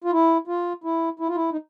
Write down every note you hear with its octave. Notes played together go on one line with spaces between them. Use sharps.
F4
E4
F4
E4
E4
F4
E4
D#4